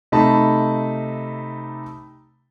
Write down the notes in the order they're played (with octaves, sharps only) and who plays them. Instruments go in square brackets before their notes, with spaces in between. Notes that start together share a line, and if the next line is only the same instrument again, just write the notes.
[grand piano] C3 A3 D#4 A5 B5